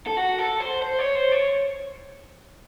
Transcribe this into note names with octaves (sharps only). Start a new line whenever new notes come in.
A4
F#4
A4
C5
C5
C#5
C5
C#5